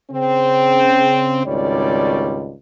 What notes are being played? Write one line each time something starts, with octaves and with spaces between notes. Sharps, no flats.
C#3 C4
G#1 C#2 G3 C#5 D5